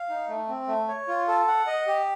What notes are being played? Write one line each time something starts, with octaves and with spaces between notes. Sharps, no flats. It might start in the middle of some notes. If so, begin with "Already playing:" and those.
Already playing: F5
D#4
A3
C4
A3
C#5
F4
A4
F#5
D#5
G4